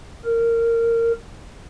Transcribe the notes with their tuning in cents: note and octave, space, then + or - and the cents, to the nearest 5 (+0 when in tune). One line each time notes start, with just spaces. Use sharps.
A#4 -15